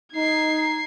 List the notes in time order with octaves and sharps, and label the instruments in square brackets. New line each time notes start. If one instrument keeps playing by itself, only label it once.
[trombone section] D#4 [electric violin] G#6 C7